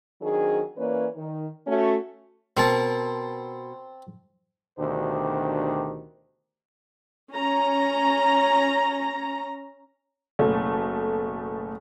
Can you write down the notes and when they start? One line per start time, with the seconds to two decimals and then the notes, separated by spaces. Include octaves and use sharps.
0.21 D#3 F#3 C4 D4 G#4
0.78 E3 A#3 C#4 B4 C#5 D5
1.17 D#3
1.67 A3 C#4 F#4
2.57 B2 C4 A#4 A5
4.79 D2 B2 D#3 D4 G4 C5
7.32 C#4 A#5
10.39 F#1 B2 A3